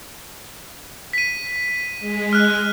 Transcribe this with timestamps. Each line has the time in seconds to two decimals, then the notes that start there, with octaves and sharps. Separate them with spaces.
1.13 B6 D#7
2.00 G#3
2.33 F6 F#6